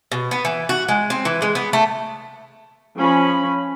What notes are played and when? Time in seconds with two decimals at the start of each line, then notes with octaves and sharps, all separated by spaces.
0.12 B2
0.31 B3
0.45 E3
0.69 F#4
0.89 G#3
1.10 C4
1.25 E3
1.42 G#3
1.55 B3
1.73 A3
2.98 F3 C#4 B5